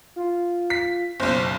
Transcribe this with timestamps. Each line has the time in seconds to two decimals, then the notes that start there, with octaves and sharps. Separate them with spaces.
0.16 F4
0.70 B6
1.20 F#1 B1 C5